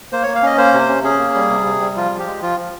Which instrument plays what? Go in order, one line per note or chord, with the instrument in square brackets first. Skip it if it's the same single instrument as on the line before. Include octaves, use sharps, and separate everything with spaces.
[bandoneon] A#3 C5
A#3 C#5
F5
C#4 D#5
A#3 C5
C3
C#4
C#4 G#4
A#3
G3
C3
C3
G3
F3 F4
F3
G4
G#3
F3 F4
F3